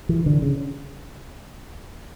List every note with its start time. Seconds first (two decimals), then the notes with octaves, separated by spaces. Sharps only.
0.09 E3
0.26 D3
0.42 C#3